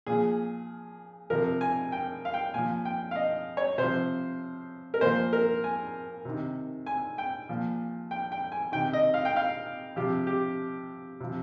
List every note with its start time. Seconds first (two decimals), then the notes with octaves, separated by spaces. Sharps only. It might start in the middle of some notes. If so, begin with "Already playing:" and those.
0.06 A#2 F3 G#4
1.30 C3 F3 A#4
1.61 G#5
1.92 G5
2.25 F5
2.34 G5
2.54 A#2 F3 G#5
2.85 G5
3.11 F5
3.15 D#5
3.57 C#5
3.78 C3 F3 C5
4.94 A#4
5.01 A#2 F3 C5
5.33 A#4
5.64 G#5
6.25 C3 D#3
6.86 G#5
7.18 G5
7.49 A#2 F3
8.11 G5
8.32 G5
8.52 G#5
8.72 C3 D#3 G5
8.93 D#5
9.14 F5
9.25 G5
9.36 F5
9.96 C3 F3 G4
10.27 G4
11.20 C3 F3